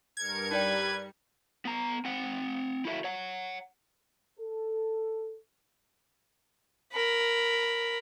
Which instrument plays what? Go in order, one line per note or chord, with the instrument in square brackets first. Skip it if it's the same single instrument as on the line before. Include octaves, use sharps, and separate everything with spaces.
[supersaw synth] G2 A#4 C#7 [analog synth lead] G#6
[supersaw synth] G3 [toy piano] D#4 D5 G5 [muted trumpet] B4
[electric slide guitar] B3 A#5
C4 F#5
E4 F#4 A4 E5
C#5 F#5
[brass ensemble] A4
[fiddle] A#4 B5